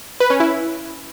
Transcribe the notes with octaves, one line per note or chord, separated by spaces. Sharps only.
B4
C#4
E4